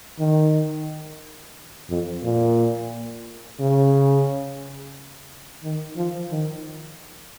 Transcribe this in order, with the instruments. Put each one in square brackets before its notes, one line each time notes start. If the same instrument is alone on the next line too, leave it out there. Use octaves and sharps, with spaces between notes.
[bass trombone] D#3
F2
A#2
C#3
D#3
F3
D#3